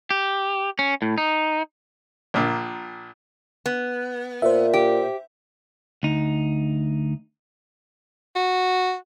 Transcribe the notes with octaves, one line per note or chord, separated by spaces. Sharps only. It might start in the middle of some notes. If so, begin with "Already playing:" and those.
G4
C#4
A2
D#4
A#1 A#2
B3
A#2 C5 E5
G4
D2 D#4
F#4